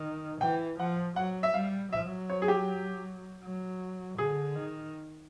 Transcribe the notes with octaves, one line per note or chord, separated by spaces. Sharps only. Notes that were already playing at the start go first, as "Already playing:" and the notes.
Already playing: D#3
E3 G5
F3 F#5
F#3 F#5
E5
G3 F5
F#3 E5
C#5
G#4
G4
F#3
D3 G#4
D#3